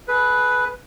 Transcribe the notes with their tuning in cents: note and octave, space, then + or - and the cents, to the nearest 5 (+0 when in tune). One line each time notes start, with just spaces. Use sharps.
G#4 +40 B4 +0